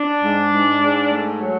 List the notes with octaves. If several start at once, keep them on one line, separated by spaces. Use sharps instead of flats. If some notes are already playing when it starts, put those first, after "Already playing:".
Already playing: D4
G#2
G#2
G#2
A3
F#3